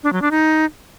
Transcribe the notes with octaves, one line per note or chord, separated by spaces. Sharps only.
D4
F#3
D4
D#4